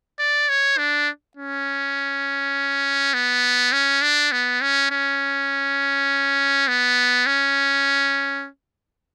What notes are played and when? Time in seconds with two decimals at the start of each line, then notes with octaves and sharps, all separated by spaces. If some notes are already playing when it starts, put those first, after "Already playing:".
0.19 D5
0.49 C#5
0.78 D4
1.37 C#4
3.14 B3
3.72 C#4
4.02 D4
4.32 B3
4.62 C#4
4.91 C#4
6.68 B3
7.27 C#4